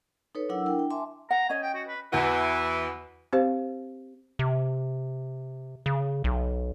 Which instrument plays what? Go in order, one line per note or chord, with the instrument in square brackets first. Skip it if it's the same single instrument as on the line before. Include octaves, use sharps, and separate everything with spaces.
[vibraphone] D#4 A4 B4 C#5
F#3 D4 E4 A#4 F#5 E6
D4 E4 A#4 G5
G5
E5 G#5 A5 C6 D6
[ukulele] F#5 [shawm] A#5
[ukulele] C#4 D#5 [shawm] G#5
[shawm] G5
F#4
B4
[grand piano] E2 F#4 [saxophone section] E3
[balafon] C4 G4 C5 F5
[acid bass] C3
C#3
B1